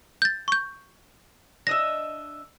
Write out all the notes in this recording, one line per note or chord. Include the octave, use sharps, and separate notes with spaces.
G6 A6
C#6 G6
D4 D#5 E5 A#6